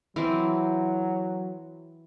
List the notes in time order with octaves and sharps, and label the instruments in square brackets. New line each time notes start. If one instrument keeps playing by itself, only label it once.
[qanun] E3 C4 [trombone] F#3